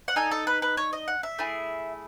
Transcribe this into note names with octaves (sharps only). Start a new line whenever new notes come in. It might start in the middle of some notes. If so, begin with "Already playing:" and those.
F#5
D#4 A4 G#5
A4
B4
B4
C#5
D#5
F#5
E5
A3 E4 G#4